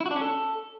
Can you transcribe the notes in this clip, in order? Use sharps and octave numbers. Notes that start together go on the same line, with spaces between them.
E4
F#4
D4
C#4
A4